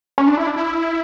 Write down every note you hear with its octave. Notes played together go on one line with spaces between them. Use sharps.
C#4
D4
E4
D4
E4